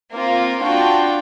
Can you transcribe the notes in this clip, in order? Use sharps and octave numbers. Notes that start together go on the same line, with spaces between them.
A#3 C4 F4 A#4
D4 F4 F#4 G5